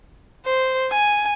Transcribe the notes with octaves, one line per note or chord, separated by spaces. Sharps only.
C5
G#5